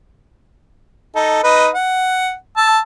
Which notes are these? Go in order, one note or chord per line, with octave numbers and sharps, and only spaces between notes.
D#4 A4
D#4 B4 D#5
F#5
A5 E6